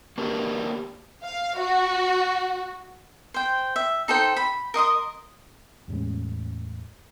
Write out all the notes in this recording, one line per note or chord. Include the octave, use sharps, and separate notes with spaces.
A#3 D4 F#4 G4 A#4
F5
F#4
C5 G5
E5
D#4 A4 C5 G5
B5
A#4 D#5 C6 D#6
E2 A2 G#3 C#4